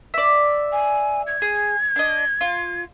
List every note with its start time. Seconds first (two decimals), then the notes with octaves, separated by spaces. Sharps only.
0.14 D5 E5
0.72 G#5
1.27 G#6
1.42 G#4
1.96 D4 D#5
2.41 F4